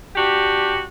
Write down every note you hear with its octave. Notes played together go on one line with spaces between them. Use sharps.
D4 F#4 G4